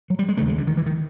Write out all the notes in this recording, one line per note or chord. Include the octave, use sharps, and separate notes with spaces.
F#3
G3
G#3
D#2 C#3 A3
G#3
D3
D#3
E3
D#3